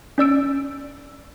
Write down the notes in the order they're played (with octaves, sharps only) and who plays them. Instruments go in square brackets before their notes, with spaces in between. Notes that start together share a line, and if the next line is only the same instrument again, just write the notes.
[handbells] C#4 D5 E6 D7